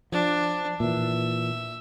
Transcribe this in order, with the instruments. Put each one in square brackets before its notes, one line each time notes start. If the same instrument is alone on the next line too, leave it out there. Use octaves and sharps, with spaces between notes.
[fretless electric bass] F3 [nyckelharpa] D4
[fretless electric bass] A#2 E3 [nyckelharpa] E5